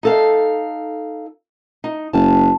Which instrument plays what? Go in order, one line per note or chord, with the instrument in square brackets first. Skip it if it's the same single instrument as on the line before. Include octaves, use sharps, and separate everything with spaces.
[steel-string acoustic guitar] D#4 A4 F5
D#4
[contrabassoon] F#1 [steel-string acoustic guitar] A5